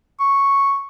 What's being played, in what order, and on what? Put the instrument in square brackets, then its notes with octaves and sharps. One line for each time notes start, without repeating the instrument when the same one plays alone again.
[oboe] C#6